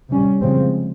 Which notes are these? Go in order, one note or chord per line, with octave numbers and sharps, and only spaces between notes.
C3 G3 C#4
C#3 F3 G#3 C4